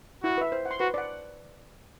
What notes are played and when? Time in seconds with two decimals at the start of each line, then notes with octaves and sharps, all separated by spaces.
0.23 E4 F#4
0.38 B4 E5
0.52 C5
0.66 F#5
0.71 C6
0.80 F#4 B4
0.94 D5 F#5